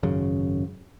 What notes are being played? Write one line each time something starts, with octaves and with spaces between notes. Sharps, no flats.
G#1 F#2 C#3